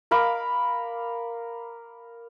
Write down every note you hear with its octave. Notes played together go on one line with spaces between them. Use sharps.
A#4 F5 B5 D6